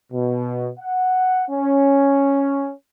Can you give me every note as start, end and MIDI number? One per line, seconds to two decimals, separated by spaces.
0.12 0.69 47
0.79 1.43 78
1.49 2.71 61